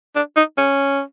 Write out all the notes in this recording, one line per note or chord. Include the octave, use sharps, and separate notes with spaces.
D4
D#4
C#4